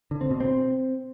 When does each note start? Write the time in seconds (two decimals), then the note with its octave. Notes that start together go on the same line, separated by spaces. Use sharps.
0.11 D3
0.21 C4
0.31 B2
0.40 C4